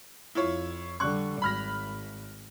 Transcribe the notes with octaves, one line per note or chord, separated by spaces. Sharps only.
F2 E4 F4 C#5
D3 G3 C#6 F#6
G#1 B5 F6 A#6